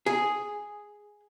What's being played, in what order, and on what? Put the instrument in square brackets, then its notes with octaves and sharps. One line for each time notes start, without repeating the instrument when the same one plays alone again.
[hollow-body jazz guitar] G#4